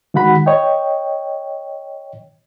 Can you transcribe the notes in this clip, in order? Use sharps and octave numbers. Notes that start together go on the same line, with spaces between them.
D#3 G#3 F#4 F#5 B5
C#5 D#5 G5